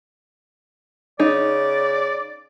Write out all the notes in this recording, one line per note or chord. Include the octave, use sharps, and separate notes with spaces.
C#3 D#4 D5